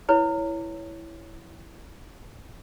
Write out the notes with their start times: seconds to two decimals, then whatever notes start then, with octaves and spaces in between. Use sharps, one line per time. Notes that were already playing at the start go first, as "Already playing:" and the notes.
0.09 E4 B4 C#5